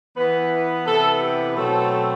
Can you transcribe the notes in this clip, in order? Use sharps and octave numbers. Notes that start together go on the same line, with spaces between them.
E3 B3 B4
C3 E3 B3 A4
G4
B2 F#3 A3 C4 A4